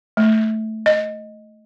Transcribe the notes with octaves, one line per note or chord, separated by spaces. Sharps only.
A3
D#5